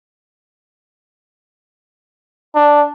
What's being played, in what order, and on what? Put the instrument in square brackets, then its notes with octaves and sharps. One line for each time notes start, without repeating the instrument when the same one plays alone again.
[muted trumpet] D4